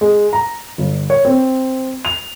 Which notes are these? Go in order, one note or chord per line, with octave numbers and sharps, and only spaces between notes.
G#3
A#5
G1
C#5
C4
F7